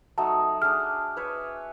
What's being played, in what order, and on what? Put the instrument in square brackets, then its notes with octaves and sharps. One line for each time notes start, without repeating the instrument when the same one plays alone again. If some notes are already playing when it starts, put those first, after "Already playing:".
[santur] F#3 A3 D#4 [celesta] A5
[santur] D4 G#4 [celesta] F6
[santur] B4 C#5 E5